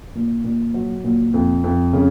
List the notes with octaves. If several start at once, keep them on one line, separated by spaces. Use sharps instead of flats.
A#2
A#2
F#3
A#2
F2
F2
C#3